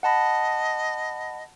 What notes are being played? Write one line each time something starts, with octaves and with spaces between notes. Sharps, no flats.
D#5 F#5 A5 B5